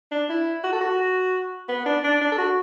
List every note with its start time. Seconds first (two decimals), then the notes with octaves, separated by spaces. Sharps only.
0.11 D4
0.29 E4
0.64 F#4
0.72 A4
0.81 F#4
1.68 B3
1.86 D4
2.04 D4
2.21 D4
2.32 A4
2.38 F#4